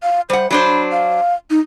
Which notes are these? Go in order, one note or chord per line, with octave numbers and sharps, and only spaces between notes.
F5
G3 C5 F#5
F#3 D4 C5 B5
F5
D#4